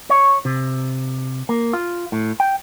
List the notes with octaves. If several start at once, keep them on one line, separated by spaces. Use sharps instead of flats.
C#5
C3
A#3
F4
A2
G5